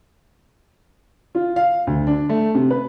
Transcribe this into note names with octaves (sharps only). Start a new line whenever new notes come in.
F4
F5
D2
D4
A3
C3
B4